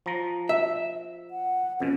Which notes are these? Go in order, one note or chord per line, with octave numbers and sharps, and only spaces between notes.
F3 A#5
E5
F#5
F2 B2 C#4